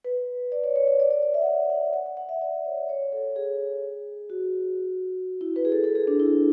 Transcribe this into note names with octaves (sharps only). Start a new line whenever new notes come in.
B4
D5
C#5
C#5
C#5
D5
D5
D5
E5
F#5
E5
F#5
F#5
F#5
F#5
E5
D5
C#5
C#5
A4
G#4
F#4
E4
B4
G#4
A4
A4
G#4
D4
E4